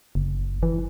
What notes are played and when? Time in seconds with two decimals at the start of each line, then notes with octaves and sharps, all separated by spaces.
0.15 F#1
0.63 E3